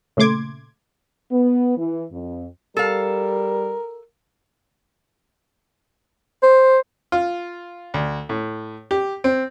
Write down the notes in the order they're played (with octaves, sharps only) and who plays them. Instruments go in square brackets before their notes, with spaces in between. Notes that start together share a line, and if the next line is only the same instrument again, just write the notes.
[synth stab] A#2 C#3 A3 C6 D6 G#6
[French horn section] B3
E3
F2
[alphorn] G3 [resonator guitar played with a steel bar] A4 F5 [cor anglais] A#4
[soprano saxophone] C5
[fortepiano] F4
D2
A2
G4
C4